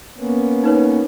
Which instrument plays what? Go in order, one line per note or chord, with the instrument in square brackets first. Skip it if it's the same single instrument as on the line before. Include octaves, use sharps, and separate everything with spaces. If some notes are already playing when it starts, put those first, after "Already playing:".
[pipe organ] A#3 B3 C#4
[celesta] D#4 B4 C#5